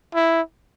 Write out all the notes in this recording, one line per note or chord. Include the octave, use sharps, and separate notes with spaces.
E4